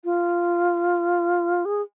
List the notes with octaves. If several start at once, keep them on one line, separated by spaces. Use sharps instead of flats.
F4
G#4